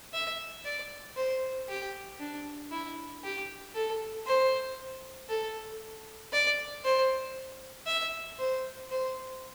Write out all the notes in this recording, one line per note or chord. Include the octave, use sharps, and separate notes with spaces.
E5
D5
C5
G4
D4
E4
G4
A4
C5
A4
D5
C5
E5
C5
C5